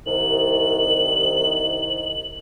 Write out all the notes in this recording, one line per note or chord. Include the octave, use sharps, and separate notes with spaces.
C2 D#3 F#7